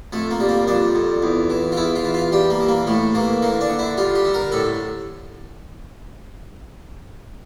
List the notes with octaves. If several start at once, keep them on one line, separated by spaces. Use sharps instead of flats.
F2 A3
A#3
G3
A#3
F2 D4
F2
E2
E3
F4
E2 E4
F4
E3
F4
G3 G4
A#3
E3
A#3
A2 A3
E3 A#3
D3 A#3
D4
D3
E4
G3 F4
G4
D3
A#4
A2 A4